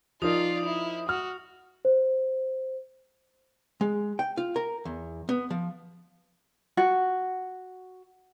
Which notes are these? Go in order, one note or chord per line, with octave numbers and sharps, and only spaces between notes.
F3 D#4 F4 A#4 D5 D#6
E4
F#4 F6
C5
G#3
G5
F4
A#4
E2
B3
F3
F#4